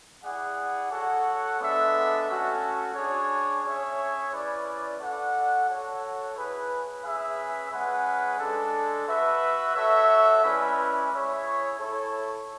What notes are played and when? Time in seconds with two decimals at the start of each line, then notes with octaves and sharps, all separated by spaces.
0.24 E4 G#4 D5 F#5
0.92 F#4 A4 C#5 F#5
1.60 G#3 B3 D4 A4 E5
2.28 A3 C#4 F#4 A4
2.95 D4 G#4 C#5
3.63 C#4 G#4 C#5 E5
4.32 C#4 E4 B4 D5
5.00 F#4 A4 D5 F#5
5.67 F#4 A4 C#5 F#5
6.36 E4 G#4 B4
7.03 C#4 G#4 B4 E5
7.71 G#3 C#4 G#4 B4 F#5
8.39 G#3 D4 A4
9.07 F#4 B4 E5
9.75 F#4 A4 C#5 E5
10.43 G#3 C#4 E4 B4 D5
11.11 E4 G#4 C#5 E5
11.79 E4 A4 C#5